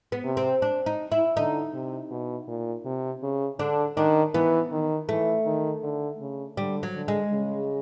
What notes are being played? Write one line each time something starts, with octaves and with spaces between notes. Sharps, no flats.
B3
C3
C4
D4
D#4
E4
D3 D#4
C3
B2
A#2
C3
C#3
D3 D4
D#3 D4
E3 B3
D#3
E3 A3
D#3
D3
C#3
D3 G3
F#3
D3
G#3
C#3